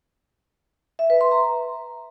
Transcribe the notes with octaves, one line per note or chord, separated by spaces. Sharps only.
E5
B4
C6
A#5